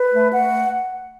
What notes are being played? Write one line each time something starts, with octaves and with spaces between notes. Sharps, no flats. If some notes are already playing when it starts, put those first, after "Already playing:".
Already playing: B4
A3
A3 F#5